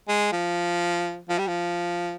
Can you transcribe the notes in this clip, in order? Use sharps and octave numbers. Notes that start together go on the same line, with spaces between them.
G#3
F3
F3
G3
F3